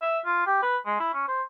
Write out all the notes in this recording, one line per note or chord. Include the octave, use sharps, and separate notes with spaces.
E5
F4
G4
B4
G#3
E4
C#4
C5